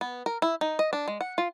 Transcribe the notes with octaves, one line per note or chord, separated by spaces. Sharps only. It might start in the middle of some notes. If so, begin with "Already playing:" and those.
B3
A#4
E4
D#4
D#5
D4
G#3
F#5
F4